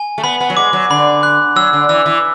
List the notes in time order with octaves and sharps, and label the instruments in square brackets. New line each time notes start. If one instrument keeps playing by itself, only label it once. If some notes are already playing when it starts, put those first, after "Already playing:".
Already playing: [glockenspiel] G#5
[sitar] A3
[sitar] B3 [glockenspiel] B5
[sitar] B3
F#3
[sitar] G#3 [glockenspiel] D6
[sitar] F#3
[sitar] D3 [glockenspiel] B5
[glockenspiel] F#6
[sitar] F#3 [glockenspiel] E6
[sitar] D3
[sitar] E3 [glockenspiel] E6
[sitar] E3